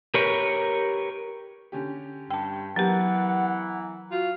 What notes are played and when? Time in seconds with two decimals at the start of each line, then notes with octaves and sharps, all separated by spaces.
0.14 G4 A#4 B4 C#5
1.72 D3 C#4 G4
2.31 G2 G5 A5
2.76 E3 F#3 B3 G4 A#4 F#5
4.11 F4 F#4